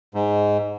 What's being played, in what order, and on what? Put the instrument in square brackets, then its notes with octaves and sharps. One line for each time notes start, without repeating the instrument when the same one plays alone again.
[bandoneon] G#2